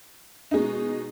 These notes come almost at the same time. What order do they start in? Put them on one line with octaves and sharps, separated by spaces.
D#4 G#3 B2